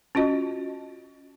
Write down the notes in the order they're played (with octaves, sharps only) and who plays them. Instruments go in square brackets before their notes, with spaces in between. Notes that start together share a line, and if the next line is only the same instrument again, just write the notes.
[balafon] C#4 F4 F#4 D#5